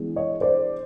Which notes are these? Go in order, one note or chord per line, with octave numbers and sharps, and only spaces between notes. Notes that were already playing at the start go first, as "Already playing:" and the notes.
Already playing: E3 G#3 B3 D4
C#5 D#5
C5 D5